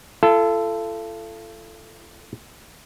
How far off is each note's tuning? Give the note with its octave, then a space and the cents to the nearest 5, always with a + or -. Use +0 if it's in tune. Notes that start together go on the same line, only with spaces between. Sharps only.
F4 -40 A4 +5